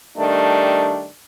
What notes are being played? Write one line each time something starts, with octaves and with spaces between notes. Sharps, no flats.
D#3 G3 A3 D4